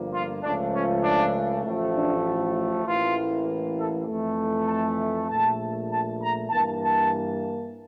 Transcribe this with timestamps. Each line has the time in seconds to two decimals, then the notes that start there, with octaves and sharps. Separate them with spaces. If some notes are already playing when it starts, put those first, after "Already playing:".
Already playing: G1 G2 F3 A#3
0.11 F4
0.42 C#2 C#3 F3 A3 D4
0.73 C#4
1.02 D4
1.64 A1 A2 F3 A3
1.94 D4
2.85 A1 A2 E3 A#3 F4
3.76 A4
4.06 F2 E3 A3
4.68 A5
5.28 A#1 A#2 A3 A5
5.89 A5
6.20 A#5
6.50 G2 E3 A#3 A5
6.81 A5